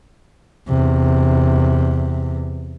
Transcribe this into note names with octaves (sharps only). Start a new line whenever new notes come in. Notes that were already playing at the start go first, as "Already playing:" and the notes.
E2 C3